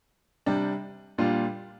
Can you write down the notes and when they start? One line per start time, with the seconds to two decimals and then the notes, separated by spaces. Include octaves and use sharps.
0.46 C3 G3 D4
1.18 A#2 G3 D4 F4